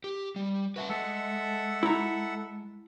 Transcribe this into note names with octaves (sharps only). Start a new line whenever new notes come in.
G4
G3
F#4 B4 E5 A5
G#3 A4 E5 F#5
E4 A#5